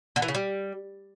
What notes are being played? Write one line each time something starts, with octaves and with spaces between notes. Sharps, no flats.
D3
E3
C#3
G3